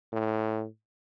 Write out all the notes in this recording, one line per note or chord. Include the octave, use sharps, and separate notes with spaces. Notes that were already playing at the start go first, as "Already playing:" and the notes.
A2